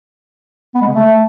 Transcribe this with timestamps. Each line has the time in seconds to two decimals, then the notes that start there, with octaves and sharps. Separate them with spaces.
0.75 B3
0.81 G#3
0.88 C#3
0.94 A3